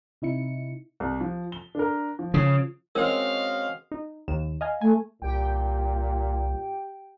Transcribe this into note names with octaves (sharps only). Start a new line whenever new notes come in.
C3 D#4 E4 C#7
C2
F3
G7
D4 A#4
F3
C#3
G#3 C4 C#4 F#4 A#4 D#5 F5
D#4
D#2 E7
D#5 F5 G#5
A3 G#5
C2 A#2 G4 G5